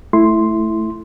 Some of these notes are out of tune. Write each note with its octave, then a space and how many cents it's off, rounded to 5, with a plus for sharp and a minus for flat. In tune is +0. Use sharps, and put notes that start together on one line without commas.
A3 -5 E4 +0 C6 +0